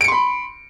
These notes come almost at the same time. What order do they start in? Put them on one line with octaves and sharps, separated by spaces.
D7 C#7 C6 B5